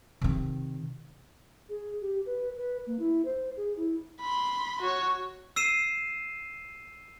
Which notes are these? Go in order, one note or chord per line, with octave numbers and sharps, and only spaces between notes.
C3 D#3
G#4
G4
B4
B4
A#3
E4
C5
G#4
E4
B5 C6
F#4 C#5
E6 C7 D#7 E7